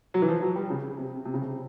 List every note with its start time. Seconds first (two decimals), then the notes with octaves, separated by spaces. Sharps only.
0.14 F#3
0.22 E3
0.28 F3
0.42 F#3
0.56 G3
0.70 C#3
0.97 C3
1.25 C3
1.34 C#3
1.42 C3